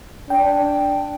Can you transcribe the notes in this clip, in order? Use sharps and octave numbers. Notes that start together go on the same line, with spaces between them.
D4 G5